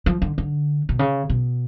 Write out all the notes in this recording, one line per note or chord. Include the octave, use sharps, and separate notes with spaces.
F3
D3
D3
B2
C#3
B2